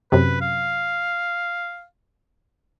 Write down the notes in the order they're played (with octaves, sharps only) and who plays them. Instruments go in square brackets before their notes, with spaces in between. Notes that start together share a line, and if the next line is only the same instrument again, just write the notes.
[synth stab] F#2 C3 [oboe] B4
[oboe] F5